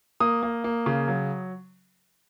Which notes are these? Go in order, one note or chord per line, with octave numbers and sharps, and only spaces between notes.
A#3 D#6
A#3
A#3
C#3
F#3